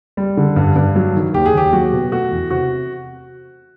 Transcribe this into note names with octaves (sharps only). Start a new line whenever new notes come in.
G3
D3
G2
G2
F#3
D#3
D#2 G4
G#4
D#2 G4
F#3 F#4
B2
A3 F#4
E2
C3 F#4